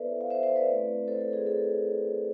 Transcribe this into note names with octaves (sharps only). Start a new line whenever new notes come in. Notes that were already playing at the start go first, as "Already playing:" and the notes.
Already playing: B3 E4 A4 B4 C5 D5 E5
F5
C5 E5
C5 E5
B4 D5
A3 C4 E4
A4 C5
A4
G#4
A4